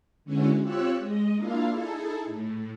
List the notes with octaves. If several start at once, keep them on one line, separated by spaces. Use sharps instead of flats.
D3 G#3 B3 C#4 E4 F#4
C4 F4 G4 C#5 E6 F#6
G#3 D#5
A#3 D4 E4 F4 F5
D#4 E4 G#4 A4
A2